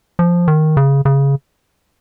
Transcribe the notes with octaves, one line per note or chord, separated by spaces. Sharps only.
F3
D#3
C#3
C#3